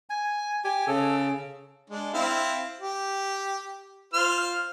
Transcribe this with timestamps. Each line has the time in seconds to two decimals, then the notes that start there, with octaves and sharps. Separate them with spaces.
0.10 G#5
0.64 G4 G#5
0.87 C#3 A4
1.90 G#3 D4
2.14 C4 E4 F5
2.80 G4
4.14 F4 C5 F6